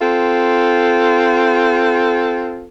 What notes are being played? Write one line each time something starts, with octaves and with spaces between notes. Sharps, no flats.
C4 F4 A4